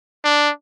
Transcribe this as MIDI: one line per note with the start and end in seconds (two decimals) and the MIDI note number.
0.25 0.51 62